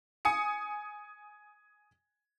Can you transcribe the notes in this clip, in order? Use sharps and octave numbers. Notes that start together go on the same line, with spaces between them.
G#5 D#6 C#7